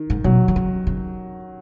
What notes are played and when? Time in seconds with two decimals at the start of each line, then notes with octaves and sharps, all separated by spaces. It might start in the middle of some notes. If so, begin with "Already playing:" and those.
Already playing: D#3
0.10 G#2
0.24 B2 F#3
0.48 D#3
0.56 C#3
0.87 C#3